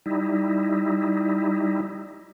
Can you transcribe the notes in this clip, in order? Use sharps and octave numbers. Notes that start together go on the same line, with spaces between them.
G3 D#4 E4